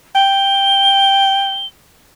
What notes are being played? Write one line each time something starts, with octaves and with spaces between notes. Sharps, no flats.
G5 G7